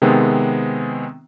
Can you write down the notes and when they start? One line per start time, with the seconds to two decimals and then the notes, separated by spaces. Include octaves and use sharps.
0.02 C3 D#3 G#3 B3 C4